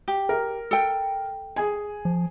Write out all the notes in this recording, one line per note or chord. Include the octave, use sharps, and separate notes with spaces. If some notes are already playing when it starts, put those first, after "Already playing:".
G4
A#4
A4 G5
G#4 G#5
F3